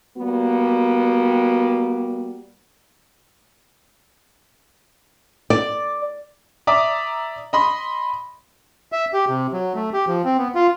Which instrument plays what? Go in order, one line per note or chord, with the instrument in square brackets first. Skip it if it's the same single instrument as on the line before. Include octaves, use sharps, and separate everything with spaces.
[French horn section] G3 A#3 B3 F#4
[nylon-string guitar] D5
[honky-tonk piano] D5 E5 A#5 D6 D#6
D#5 B5 C6
[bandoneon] E5
G4
C3
F#3
A3
G4
F3
C4
B3
F4